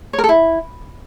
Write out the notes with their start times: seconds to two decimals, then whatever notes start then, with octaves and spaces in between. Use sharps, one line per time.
0.13 C#5
0.19 A#4
0.24 A4
0.29 E4